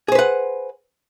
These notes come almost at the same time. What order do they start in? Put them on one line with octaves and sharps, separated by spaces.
G#4 C5 B4 F#5